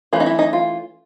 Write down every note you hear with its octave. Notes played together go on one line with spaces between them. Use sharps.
E3 A3 C#4 F4
D#4
E4
D#4
F4